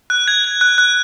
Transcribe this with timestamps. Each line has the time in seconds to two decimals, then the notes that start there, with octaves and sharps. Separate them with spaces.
0.10 F#6
0.28 G#6
0.44 G#6
0.61 F#6
0.78 F#6